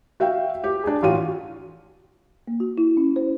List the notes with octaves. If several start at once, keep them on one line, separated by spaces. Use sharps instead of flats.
F#4 E5 F5 G5
G4
D4 G#4
A1 F4 F#4 D#7
A#3
F#4
E4
C#4
C5